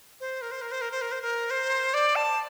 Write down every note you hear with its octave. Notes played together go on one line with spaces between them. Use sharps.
C5
A#4
C5
A#4
C5
A#4
C5
A#4
C5
A#4
C5
D5
A5